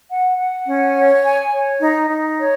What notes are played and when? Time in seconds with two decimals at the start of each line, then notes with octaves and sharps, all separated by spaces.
0.10 F#5
0.38 F#5
0.67 C#4
0.95 C#5
1.24 G#5
1.52 C#5
1.81 D#4
2.09 D#4
2.38 C#5